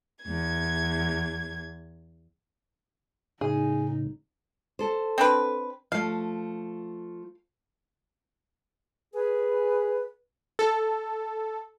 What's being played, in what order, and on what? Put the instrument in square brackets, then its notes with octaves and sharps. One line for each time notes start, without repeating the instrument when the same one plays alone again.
[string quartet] E2 G#6
[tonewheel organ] A2 C#3 [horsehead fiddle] D#4 [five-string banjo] G#4
[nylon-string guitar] A4 C5
[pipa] C4 D4 B4
[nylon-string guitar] F3 A3 [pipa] F5
[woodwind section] G#4 [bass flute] B4
[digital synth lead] A4